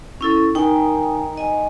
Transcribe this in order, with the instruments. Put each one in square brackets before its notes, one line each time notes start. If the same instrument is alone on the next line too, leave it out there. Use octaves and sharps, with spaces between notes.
[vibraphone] C#4 E4 A4
[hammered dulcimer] D#3 [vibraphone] D#4 G5 G#5
[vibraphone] D#5 G#5